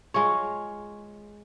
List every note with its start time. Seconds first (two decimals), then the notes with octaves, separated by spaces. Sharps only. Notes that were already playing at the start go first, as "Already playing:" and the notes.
0.14 G#3 F4 C#5